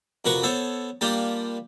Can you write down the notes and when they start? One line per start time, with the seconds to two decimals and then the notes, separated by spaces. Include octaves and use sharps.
0.25 F2 C3 F#4 A#4 B4 C#6
0.43 B3 A4 C5 C#5
1.01 G3 A#3 D4 F4 G4